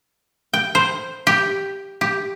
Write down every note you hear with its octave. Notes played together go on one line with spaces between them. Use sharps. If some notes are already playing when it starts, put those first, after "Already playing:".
G5
C5
G4
G4